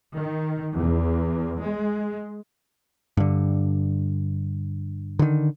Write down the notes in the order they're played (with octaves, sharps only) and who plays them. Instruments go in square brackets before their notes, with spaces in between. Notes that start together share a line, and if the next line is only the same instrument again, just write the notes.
[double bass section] D#3
E2
G#3
[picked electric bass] G2 D3
D3 D#3